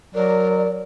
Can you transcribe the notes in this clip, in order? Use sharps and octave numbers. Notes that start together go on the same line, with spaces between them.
F#3 A#4 D5